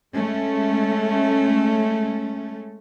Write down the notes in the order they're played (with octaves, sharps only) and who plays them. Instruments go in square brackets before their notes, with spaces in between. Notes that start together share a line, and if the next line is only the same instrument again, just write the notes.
[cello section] G#3 A3 C#4